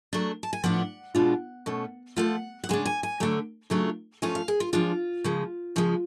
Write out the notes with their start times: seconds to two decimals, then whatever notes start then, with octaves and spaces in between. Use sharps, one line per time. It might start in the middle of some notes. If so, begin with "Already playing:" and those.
0.13 F#3 A3 D4
0.43 A5
0.53 G#5
0.64 A2 F3 B3 D4 F#5
1.15 B2 G#3 D4 F4
1.66 B2 A3 C#4
2.16 F3 A3 F4 F#5
2.64 F#5
2.69 C#3 G#3 D4 G#5
2.86 G#5
3.03 G#5
3.20 D3 F#3 A3
3.70 C#3 F#3 A3 D4 F4
4.22 F3 A3 C#4 F4 G#5
4.35 F5
4.48 G#4
4.60 F4
4.73 F3 G#3 D4 F4
5.24 C#3 F3 G#3
5.76 C#3 F3 G#3